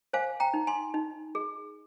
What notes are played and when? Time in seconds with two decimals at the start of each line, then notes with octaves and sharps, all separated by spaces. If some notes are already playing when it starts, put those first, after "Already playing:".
0.13 C5 F5 G#5
0.40 G5 A#5
0.54 D#4
0.67 G#5 C6
0.94 D#4
1.35 G#4